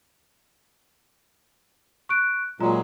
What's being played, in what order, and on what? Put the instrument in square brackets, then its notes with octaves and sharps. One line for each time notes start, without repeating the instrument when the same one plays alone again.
[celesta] C#6 F#6 D7
[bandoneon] A#2 F#3 G#3 [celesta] F4 A#5